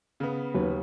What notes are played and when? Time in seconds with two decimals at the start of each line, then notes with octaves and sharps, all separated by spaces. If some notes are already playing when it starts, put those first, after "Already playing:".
0.20 C#3 B3
0.54 D#2 F#3 B4